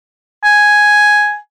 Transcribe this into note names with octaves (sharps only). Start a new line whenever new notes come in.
G#5